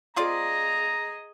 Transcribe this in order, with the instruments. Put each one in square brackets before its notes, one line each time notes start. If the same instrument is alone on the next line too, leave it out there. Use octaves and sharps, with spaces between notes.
[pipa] C4 F4 D5 [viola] G#4 D#5 [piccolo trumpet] A#5